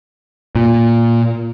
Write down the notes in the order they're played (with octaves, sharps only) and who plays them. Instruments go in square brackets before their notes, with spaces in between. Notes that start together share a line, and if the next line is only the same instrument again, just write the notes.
[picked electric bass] A#2